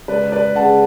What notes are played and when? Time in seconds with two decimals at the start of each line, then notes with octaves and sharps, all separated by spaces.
0.08 C#2 B4 D5
0.32 B4 D5
0.55 C#3 F#5 A5